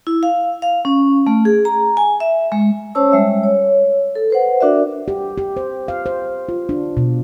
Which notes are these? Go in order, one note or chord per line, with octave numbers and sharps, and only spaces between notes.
E4
F5
F5
C#4
A3
G#4
A#5
G#5
E5
G#3
C#4 C5 C#5 A5 E6
G3 G#3 E5
C#5
A4
B4 C5 F#5
D4 F#4 A#4 D5 E5
G4
G4
C5
F5
C5
F4
D4
B2